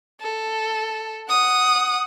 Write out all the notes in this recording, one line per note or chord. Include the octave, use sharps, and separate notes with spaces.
A4
F#5 D#6